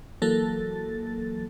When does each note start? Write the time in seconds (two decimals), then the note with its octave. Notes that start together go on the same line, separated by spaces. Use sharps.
0.22 E3 F#3 A#3 A4 A6